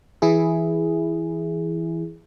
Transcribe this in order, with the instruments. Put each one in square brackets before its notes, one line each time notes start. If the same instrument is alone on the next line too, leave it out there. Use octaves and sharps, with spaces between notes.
[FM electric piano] E3 E4 G#4